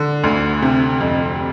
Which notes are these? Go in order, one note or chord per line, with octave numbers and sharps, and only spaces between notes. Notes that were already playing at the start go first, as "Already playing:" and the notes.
Already playing: D3
D2
C3
F2